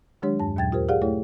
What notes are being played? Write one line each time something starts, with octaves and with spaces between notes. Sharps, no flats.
D#3 F#3 G#3 D4 G4 C#5
E2 G2 A5
D#2 A#2 F#3 G5 G#6 A6
F4 G4 A#4 C5
G4 G#4 D5 F5 F#5
A3 E4 A4 C#5